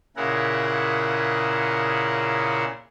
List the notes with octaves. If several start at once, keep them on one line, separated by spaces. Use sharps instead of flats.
A#2 C#3 E4 G#4 A#4 F#5